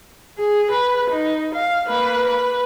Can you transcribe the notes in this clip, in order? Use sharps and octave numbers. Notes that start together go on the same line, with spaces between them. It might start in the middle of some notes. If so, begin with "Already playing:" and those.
G#4
B4
D#4
F5
A#3 B4
B4